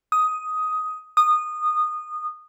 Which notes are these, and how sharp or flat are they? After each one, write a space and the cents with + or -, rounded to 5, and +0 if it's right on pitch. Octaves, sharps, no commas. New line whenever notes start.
D#6 +10
D#6 -20